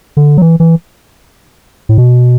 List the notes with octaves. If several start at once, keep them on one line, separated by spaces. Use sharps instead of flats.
D3
F#3
E3
E3
A2
B2